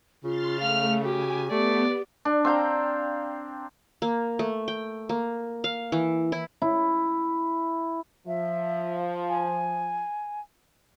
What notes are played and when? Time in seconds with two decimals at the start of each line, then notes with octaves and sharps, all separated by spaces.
0.24 C#3 F4 C6 F6 A6
0.60 A3 F5 F6 F7
1.04 F#4 G4 G#5
1.51 A3 B3 G4 D5
2.25 D4
2.45 C4 F5 G5 A#5
4.02 A#3
4.39 A3
4.68 G5
5.09 A#3
5.64 F5
5.92 E3
6.32 E4
6.62 E4
8.27 F3 E5
9.29 G#5